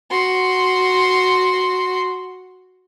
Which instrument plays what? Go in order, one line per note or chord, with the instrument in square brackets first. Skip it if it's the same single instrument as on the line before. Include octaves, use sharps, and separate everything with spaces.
[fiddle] F#4 C6